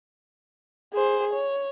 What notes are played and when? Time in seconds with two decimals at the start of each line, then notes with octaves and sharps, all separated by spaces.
0.93 G#4 C5
1.33 C#5